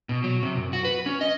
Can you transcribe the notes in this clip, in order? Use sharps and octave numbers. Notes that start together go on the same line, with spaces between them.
B2
F#3
C3
F#2
F#4
B4
C#4
D#5